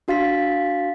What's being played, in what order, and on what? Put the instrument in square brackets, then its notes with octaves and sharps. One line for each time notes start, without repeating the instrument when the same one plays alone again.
[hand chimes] D4 F#4 F5 A6 B6